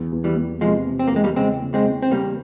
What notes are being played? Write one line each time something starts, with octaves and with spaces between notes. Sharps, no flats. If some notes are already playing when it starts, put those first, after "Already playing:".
Already playing: E2
E2
E3 G3
E2
C3 F3 G#3
C3
C4
A#3
E2 G#3
G3 A#3
C#3 G#3 C4
C#3
G#3 C4
C#3
C4
C#3 G3 A#3